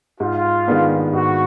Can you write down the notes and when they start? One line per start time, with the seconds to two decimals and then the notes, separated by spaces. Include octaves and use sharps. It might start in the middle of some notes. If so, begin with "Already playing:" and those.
0.20 G#2 F4
0.68 D#3 G#3 B3 D4
1.13 G#2 F#4